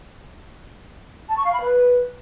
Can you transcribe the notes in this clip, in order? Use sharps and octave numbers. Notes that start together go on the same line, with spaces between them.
A5
C#6
F5
B5
B4